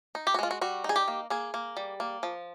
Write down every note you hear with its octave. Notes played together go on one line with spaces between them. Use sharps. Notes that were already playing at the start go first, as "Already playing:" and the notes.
D#4
G4
F#4
G#3 F4
F#4
G3 F#4
D#4 G#4
G4
A#3
A#3 G#4
A#3
G3
A#3
F3